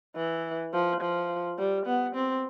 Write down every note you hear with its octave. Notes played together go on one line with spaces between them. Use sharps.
E3
F3
F3
G3
B3
C4